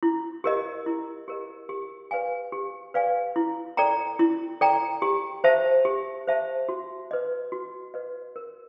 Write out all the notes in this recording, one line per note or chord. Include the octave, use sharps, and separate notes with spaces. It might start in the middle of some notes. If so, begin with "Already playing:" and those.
E4
G4 A#4 D#5
E4
G4 A#4 D#5
G4
B4 D5 F5 G#5
G4
B4 D5 F5 G#5
E4
A4 D5 G5 A#5
E4
A4 D5 G5 A#5
G4
C5 E5 A5
G4
C5 E5 A5
F#4
B4 D#5
F#4
B4 D#5
A#4